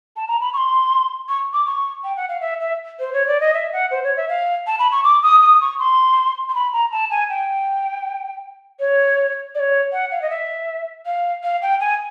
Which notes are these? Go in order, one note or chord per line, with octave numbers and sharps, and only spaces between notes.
A5
A#5
B5
C#6
C6
C#6
D6
C#6
G5
F#5
F5
E5
E5
C5
C#5
D5
D#5
E5
F#5
C5
C#5
E5
F5
A5
B5
C#6
D6
D#6
D#6
C#6
C6
C6
B5
A#5
A5
G#5
G5
C#5
D5
C#5
F#5
F5
D#5
E5
F5
F5
G5
G#5